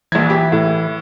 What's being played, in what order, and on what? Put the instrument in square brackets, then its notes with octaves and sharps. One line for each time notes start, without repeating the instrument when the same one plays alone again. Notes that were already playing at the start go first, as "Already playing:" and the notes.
[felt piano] A#1 G#6 [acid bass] E3
[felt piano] G4
A2